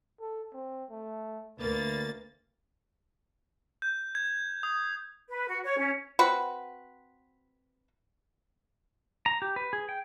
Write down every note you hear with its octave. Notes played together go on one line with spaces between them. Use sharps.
A4
C4
A3
D2 A#3 B4 A6
G6
G#6
D#6
B4
F#4
C#5
C#4
C4 F#4 B4
A#5
G4
B4
G#4
G5